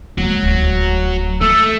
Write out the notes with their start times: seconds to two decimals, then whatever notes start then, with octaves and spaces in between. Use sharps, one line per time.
0.18 D#2 F#3 G#3
0.43 D1 D2
1.41 F#3 A3 A4